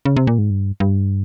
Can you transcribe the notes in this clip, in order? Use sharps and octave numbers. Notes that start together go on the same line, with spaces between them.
C#3
C3
A#2
G#2
G2
G2